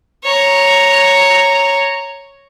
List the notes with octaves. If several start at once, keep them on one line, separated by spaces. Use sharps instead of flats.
C#5 A#5